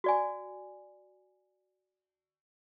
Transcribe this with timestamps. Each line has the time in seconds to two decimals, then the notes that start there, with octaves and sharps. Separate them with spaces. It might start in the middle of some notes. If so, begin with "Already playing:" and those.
0.04 F#4 D5 G#5